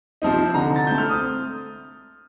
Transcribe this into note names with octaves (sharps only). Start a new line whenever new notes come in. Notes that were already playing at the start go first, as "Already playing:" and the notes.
C3 F3 C4 D#4
D3 A#5
A6
A3 C4 G6
F6
D#6